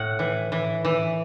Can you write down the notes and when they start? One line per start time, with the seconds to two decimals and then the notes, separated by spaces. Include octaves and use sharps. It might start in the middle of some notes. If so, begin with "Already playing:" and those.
Already playing: A2 F#5
0.19 E3
0.52 E3
0.85 E3